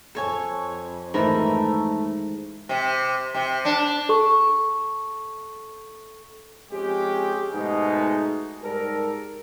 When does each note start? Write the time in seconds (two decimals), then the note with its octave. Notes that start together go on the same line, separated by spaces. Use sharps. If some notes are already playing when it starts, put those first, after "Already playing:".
0.15 F2 A4 C#5 G#5
1.14 G#2 D#3 E3 A3 A#4 A#5 B5
2.69 C3
3.34 C3
3.65 D4
4.09 A4 C#6
6.72 F2 G#3 C#4 G4
7.53 G#2 B2 G#3 A3 D#4
8.63 G#2 G3 A4 A#4